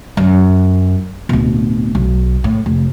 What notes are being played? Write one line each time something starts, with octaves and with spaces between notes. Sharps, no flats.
F#2
D1 B2
B1
A2
F1